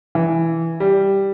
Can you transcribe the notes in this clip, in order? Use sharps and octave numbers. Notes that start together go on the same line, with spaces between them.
E3
G3